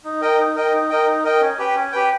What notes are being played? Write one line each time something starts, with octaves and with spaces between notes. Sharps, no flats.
D#4
A#4 D#5 G5
D#4
A#4 D#5 G5
D#4
A#4 D#5 G5
D#4
A#4 D#5 G5
C#4
G4 B4 G5
C#4
G4 B4 G5